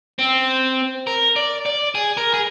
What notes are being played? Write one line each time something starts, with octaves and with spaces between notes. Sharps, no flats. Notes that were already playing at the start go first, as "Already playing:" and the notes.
C4
A#4
D5
D5
G#4
A#4
G#4